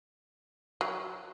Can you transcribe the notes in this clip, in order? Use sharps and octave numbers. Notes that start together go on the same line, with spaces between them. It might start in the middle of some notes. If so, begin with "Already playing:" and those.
F#3